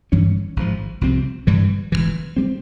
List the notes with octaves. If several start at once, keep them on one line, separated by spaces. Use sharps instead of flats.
G2 E3 G3 C#4
G#1 G#2 F3
C2 C3 F3 C4
G2 E3 G3
E1 E2 E3
G3 C4